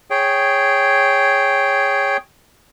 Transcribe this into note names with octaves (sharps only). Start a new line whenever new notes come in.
G#4 C#5 G5